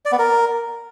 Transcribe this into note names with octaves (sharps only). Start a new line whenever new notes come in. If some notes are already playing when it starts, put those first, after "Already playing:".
D5
B3
A#4